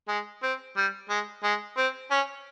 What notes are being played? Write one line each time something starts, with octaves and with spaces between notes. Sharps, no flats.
G#3
C4
G3
G#3
G#3
C4
C#4